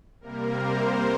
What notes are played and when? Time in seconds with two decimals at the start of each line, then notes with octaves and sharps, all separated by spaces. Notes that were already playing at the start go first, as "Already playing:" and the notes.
0.20 C3 G3 A#3 A#4
0.58 C5